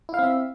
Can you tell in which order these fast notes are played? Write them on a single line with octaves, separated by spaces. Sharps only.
E4 F5 C4 E5